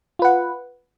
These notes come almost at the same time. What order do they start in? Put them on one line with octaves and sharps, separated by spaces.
F4 B4 F#5